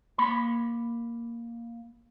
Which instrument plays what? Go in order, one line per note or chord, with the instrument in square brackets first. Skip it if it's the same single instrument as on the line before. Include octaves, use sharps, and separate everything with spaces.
[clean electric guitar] A#3 B5